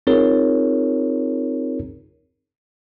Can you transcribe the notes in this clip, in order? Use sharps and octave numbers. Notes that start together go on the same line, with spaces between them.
C4 D#4 F4 G#4 A#4 C#5